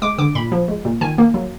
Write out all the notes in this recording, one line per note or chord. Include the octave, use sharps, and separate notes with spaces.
G#3 D6
D3 D6
A#2 B5
F3
G#3
A#2
D#3 G#5
A#3
F#3